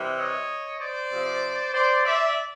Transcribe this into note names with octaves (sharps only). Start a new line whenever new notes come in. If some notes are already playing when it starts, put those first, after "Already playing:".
Already playing: C3 E3 G3
C#5 D#5
C5 D5
C3 F3
C5 D5
D5 E5